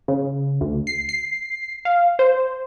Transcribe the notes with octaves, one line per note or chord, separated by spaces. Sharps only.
C#3
D2
C7
C7
F5
C5